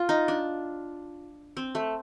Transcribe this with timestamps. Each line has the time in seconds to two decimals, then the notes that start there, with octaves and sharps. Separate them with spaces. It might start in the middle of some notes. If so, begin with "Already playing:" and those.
Already playing: F4
0.09 D#4
0.28 D4
1.57 C4
1.75 A3